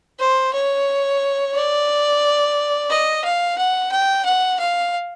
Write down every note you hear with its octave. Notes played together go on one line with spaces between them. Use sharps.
C5
C#5
D5
D#5
F5
F#5
G5
F#5
F5